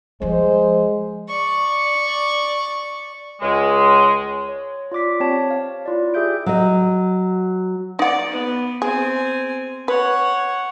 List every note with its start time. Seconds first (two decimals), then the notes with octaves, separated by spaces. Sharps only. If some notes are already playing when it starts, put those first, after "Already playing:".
0.22 F3 G3 G#3 C5
1.28 D5 C#6
3.41 C#2 G#3
4.49 C#5
4.92 F4 D5 D6 B6
5.20 C4 G4 C#5 A5
5.51 F5
5.86 E4 F4 D5
6.14 G4 G#4 E5 G6 D7
6.46 F#3 D#5
7.99 D#4 D5 F#5
8.31 B3 B4
8.82 C4 G#4 G#5
9.88 B4 C#5 F#5